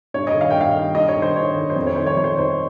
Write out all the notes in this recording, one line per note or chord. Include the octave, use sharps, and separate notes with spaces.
G2 C#5
D#5
D#3
F5
G2 G5
F5
D#3
G2 D#5
C#5
D#3
C5
G2 C#5
D#3
C5
F2 C#5
C#5
D#3 C5
C#5
F2 C#5
C5
D#3 C5